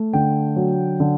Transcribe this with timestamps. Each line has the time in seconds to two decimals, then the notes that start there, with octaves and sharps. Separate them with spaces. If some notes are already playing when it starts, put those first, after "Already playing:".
Already playing: A3
0.13 D3 G5
0.56 F#3
1.00 D3